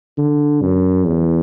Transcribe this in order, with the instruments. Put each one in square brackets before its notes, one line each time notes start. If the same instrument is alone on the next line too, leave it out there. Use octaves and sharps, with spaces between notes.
[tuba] D3
F#2
E2